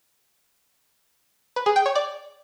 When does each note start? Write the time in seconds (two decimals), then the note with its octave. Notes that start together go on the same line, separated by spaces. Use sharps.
1.56 B4
1.66 G#4
1.76 G5
1.86 C#5
1.95 D5